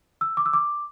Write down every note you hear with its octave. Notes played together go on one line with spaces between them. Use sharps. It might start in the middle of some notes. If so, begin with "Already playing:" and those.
E6
D6
E6
D6